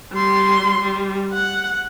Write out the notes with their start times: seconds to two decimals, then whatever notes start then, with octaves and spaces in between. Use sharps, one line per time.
0.13 G3 C6
0.81 G3
1.33 F#5